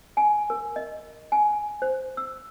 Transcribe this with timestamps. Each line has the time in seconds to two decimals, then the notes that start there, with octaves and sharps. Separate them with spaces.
0.17 G#5
0.50 A#4
0.76 D#5
1.32 G#5
1.82 C5
2.17 E6